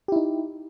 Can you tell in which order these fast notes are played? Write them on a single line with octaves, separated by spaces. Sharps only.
G4 E4 D#4